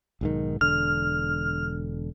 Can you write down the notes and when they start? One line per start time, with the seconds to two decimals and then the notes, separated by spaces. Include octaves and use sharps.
0.21 B1 G#2 D#3
0.61 E1 D3 F6